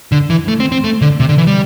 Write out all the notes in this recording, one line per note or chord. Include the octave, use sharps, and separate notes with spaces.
D3
E3
A3
C4
C4
A3
D3
C3
D3
E3
G3